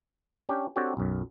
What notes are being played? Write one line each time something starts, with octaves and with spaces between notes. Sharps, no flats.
C#4 D4 G4
C4 D4 F#4 G4 A4 C#5
B1 F#2